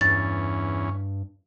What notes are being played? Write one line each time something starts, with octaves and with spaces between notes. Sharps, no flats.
E2 G2 C#4 A6